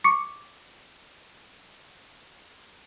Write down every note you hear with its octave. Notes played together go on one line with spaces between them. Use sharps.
C#6 D6 C#7